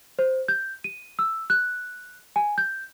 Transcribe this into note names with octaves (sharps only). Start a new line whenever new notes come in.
C5
G6
D#7
E6
F#6
G#5
G6